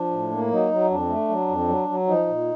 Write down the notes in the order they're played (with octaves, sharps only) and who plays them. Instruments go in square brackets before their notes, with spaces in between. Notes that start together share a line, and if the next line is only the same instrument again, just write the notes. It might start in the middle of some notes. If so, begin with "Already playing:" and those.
Already playing: [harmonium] F3 D4
A2
A#3
F#3 D#4
F#3
F2 D4
A3
F#3
F2
F#3
F#3
F3 D#4
A#2